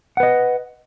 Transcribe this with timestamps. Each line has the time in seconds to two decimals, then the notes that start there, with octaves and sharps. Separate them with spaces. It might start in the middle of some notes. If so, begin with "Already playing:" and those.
0.17 F#5
0.20 B4
0.23 D#5